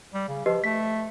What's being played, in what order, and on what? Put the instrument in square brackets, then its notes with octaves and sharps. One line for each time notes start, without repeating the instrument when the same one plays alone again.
[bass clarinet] G3
C#3
[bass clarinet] F3 [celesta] G4 B4 D#5
[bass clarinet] A3 [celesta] B6